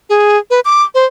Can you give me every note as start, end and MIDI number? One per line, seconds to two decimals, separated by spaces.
0.09 0.37 68
0.50 0.60 71
0.65 0.83 86
0.95 1.05 72